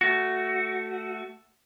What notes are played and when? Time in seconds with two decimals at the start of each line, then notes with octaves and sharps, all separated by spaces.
0.01 A3 F#4